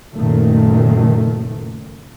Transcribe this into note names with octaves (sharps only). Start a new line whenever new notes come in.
F#1 F#2 A#2 D#3 A3